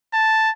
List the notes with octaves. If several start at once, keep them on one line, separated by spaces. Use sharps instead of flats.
A5